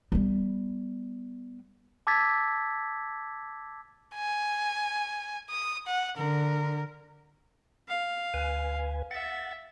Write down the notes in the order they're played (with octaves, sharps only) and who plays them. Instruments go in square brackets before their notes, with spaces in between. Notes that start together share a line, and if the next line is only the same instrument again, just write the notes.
[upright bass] G3 B3
[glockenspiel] A5 D6 E6 G#6 A6 B6
[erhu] G#5
D#6
F#5
[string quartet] D3 [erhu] A#4
[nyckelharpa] F5
[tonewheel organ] D2 B4 G#5
[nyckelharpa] E5 [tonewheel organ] F#5 A6